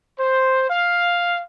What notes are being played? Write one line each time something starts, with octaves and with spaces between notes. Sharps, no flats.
C5
F5